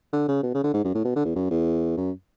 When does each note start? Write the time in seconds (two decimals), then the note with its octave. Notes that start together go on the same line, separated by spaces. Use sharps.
0.13 D3
0.28 C#3
0.43 B2
0.54 C#3
0.64 D3
0.74 G#2
0.84 F#2
0.95 A2
1.05 B2
1.15 D3
1.25 E2
1.35 F#2
1.51 E2
1.97 F#2